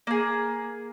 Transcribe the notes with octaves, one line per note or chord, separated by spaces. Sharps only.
A#3 G#4